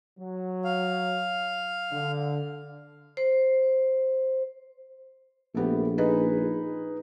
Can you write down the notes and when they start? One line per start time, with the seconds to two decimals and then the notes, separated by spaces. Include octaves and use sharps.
0.18 F#3
0.64 F5
1.92 D3
3.17 C5
5.55 A#1 A3 B3 G4
5.98 D#4 G#4 B4